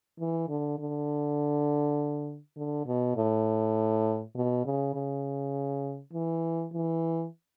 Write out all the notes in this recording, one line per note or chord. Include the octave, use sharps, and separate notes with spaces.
E3
D3
D3
D3
B2
A2
B2
C#3
C#3
E3
E3